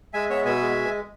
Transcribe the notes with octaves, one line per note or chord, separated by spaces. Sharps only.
G#3 E5 G#5
B3 C#5 E5
B2 E5 G#5
G#3